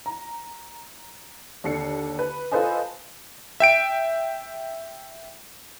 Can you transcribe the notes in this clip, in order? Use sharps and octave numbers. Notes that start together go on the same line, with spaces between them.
A#5
D#2 D3 C7 C#7
B4
F4 A4 B4 C5 D#5 G#5
E5 G5 D7